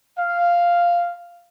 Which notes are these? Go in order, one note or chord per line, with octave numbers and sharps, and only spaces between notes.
F5